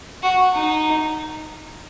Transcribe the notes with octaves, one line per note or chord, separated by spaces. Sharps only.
F#4
D#4